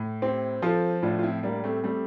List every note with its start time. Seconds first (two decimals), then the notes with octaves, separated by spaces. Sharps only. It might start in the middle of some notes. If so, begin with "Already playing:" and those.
Already playing: A2
0.22 C4 E4 G4
0.62 F3 F4 A4
1.02 A2 D4 F4
1.19 F4
1.23 C4 E4
1.43 G3 A#3 D4
1.64 A3 C4
1.84 G3 A3 C4